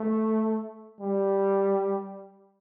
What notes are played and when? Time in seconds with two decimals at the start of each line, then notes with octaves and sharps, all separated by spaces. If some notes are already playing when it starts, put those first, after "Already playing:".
Already playing: A3
1.00 G3